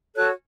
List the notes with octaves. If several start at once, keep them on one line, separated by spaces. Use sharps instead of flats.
F#4 A4 C#5 F#6